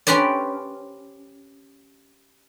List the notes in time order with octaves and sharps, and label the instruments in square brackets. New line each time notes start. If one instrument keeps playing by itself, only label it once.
[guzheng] C#4 G4 B4 C5 D5